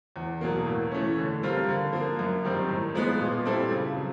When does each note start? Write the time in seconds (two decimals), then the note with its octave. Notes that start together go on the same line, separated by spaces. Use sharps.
0.16 E2
0.41 B2 F#3 A#3
0.67 A2
0.91 E3 A3 C#4
1.18 D3
1.43 G3 C4 F4 A#4
1.68 D3
1.93 F3 A#3
2.19 F#2
2.44 D#3 G3 C4
2.69 A2
2.95 F3 G#3 B3
3.21 A#2
3.46 G3 C4 E4 A4
3.71 C#3
3.97 F#3